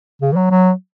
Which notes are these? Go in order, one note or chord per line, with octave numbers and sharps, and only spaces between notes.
C#3
E3
F#3
F#3